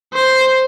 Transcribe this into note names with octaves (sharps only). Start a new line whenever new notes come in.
C5